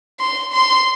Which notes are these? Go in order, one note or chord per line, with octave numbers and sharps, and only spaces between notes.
C6
C6